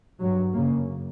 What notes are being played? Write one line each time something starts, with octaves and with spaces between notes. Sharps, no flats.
G2 F#3
F#2 C#3 A#3